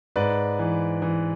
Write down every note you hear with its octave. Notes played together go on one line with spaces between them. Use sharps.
G#2 B4 D5
E3
E3